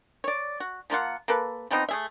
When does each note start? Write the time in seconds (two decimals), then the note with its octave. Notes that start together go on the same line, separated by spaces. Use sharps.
0.24 C#5 D5
0.60 F#4
0.90 F3 A#3 F4 F#5
1.28 A#3 A4 B4
1.71 F3 B3 C4 D#4
1.89 A3 G#4 E5